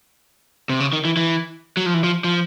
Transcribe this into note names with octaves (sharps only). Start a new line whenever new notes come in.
C3
C#3
D#3
E3
E3
F#3
F3
E3
F3
F3